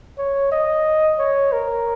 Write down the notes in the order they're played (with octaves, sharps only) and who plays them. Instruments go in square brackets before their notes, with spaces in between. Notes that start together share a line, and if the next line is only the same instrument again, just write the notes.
[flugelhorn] C#5
D#5
C#5
A#4